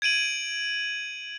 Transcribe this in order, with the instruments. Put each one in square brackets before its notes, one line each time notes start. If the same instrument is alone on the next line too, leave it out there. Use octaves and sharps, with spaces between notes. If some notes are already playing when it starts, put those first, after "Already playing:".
[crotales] G#6 D7 D#7 F#7